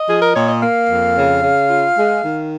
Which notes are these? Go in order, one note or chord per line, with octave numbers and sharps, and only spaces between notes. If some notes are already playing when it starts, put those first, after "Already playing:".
Already playing: D#5
F3 G#4
A#4
A#2 C#5
D#5
A#3 F5
F2
C#3
C#3
F4
G#3
D#3